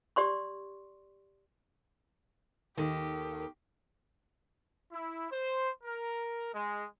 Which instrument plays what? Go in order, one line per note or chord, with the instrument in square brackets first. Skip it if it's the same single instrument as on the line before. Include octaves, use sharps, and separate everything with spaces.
[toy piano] G4 D5 C6 C#6
[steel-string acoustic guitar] D#2 A4 [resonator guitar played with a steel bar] D#3 [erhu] G4
[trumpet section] E4
C5
A#4
G#3